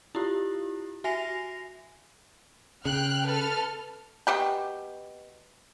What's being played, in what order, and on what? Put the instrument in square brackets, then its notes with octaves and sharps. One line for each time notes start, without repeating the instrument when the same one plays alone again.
[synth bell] E4 F4 G4
F#4 E5 G#5 A#6 C7 F7
[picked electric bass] C#3 [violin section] G5 F6 F#6
[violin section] A4 B4 F6
[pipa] B2 G4 G5